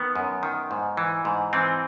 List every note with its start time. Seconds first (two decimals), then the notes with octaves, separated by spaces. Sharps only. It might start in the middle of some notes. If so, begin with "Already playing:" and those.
Already playing: D#3 B3
0.15 F#2
0.43 D#3
0.71 G#2
0.97 E3
1.25 G#2
1.53 E3 C4